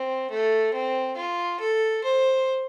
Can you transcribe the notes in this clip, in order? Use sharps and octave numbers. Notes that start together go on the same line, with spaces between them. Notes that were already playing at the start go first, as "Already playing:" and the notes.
Already playing: C4
A3
C4
F4
A4
C5